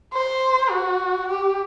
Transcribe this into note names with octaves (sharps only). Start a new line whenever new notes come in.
C5
F#4
G4